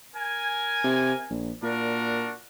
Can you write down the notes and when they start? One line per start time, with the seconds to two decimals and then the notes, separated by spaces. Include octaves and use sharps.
0.16 A#4 G#5
0.84 C3
1.30 A#1
1.63 A#2 D4 F#4 A#4